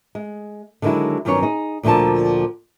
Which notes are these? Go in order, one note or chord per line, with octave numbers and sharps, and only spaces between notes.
G#3
D3 D#3 F#3 G#3 E4
G2 D#3 F#3 B3 C#4 C#5
D#4 G#4
D2 A#2 D3 F3 A#4 A5